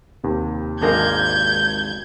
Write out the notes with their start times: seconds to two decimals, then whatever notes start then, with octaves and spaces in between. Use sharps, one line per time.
0.24 D#2 C3
0.81 G#1 G#3 A#3 D4 A#4 G6 G#6